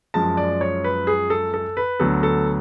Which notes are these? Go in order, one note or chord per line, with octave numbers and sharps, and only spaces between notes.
F#2 F3 G#3 A5
D5
C#5
B4
G#4
A4
A4
B4
D2 D3 F#3 B3 A4
A4